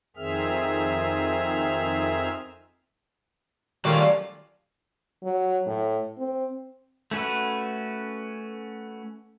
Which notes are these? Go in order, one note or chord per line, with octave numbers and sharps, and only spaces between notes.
F2 D#3 C4 G#4 E5 F6
D#3 F#3 G3 A3 C#4 F4 D5
F#3
A2
C4
A3 C#4 F#4 B4